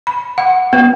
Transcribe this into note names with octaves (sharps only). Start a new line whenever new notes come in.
B5
F#5
B3